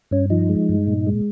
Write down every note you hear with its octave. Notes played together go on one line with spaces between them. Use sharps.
G2 C#4
F3 D#4
G#3
G2
A#2
G#3